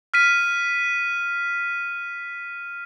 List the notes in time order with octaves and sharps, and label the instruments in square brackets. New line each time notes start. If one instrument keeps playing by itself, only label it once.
[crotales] F6 B6 D#7